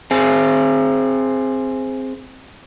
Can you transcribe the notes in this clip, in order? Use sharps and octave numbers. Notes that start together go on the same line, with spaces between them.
C4 G#4